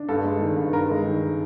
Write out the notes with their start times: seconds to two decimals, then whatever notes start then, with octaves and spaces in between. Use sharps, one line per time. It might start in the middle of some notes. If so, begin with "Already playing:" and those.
Already playing: D4
0.09 G2 A4
0.24 G#3
0.40 D#3
0.56 G2
0.73 G2 A#4
0.90 G#3
1.06 D#3